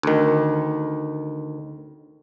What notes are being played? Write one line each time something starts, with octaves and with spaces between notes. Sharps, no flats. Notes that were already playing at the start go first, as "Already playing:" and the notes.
D2 D#3